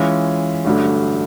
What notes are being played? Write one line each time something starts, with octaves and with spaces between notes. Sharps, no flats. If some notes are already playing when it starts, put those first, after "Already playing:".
Already playing: E3 G#3 C#4 F4
A1 G2 D3 F#3 A3